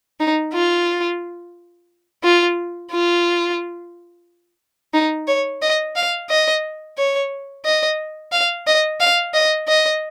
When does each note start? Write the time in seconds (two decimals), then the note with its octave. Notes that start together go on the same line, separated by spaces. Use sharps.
0.20 D#4
0.53 F4
2.23 F4
2.91 F4
4.93 D#4
5.27 C#5
5.62 D#5
5.96 F5
6.30 D#5
6.98 C#5
7.65 D#5
8.33 F5
8.67 D#5
9.00 F5
9.34 D#5
9.68 D#5